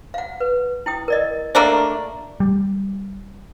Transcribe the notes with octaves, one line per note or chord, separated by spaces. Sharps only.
F5 F#5
B4
E4 G5 D#6
A#4 D5 D#5
A3 A#3 D4
G3